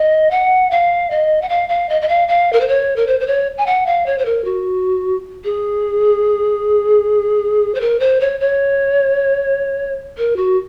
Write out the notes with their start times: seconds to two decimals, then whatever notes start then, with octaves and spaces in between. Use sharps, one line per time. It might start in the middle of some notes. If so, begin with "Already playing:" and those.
Already playing: D#5
0.31 F#5
0.71 F5
1.10 D#5
1.42 F#5
1.49 F5
1.69 F5
1.89 D#5
2.01 D#5
2.09 F5
2.28 F5
2.53 A#4
2.61 C5
2.68 C#5
2.96 A#4
3.07 C5
3.20 C5
3.27 C#5
3.58 G#5
3.67 F#5
3.86 F5
4.06 C#5
4.18 C5
4.26 A#4
4.45 F#4
5.44 G#4
7.75 C5
7.81 A#4
8.00 C5
8.20 C#5
8.40 C#5
10.18 A#4
10.36 F#4